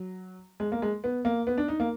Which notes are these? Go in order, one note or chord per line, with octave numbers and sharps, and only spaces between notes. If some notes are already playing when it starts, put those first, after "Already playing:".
Already playing: F#3
G#3
A#3
G#3
B3
A#3
B3
D4
D#4
A#3